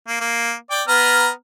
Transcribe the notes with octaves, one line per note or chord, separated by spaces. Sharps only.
A#3
A#3
D5 G5 D6
B3 A#5 F6